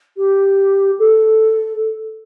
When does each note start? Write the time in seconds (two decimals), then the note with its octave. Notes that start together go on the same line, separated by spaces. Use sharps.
0.17 G4
0.99 A4